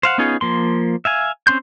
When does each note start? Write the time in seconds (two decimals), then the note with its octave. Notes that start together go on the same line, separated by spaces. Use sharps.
0.03 C5 F5 F#5
0.18 B3 C#4 D#4 F4 G#4
0.41 F3 A#3 C6
1.05 E5 F5 G#5
1.47 C4 C#4 C6 G6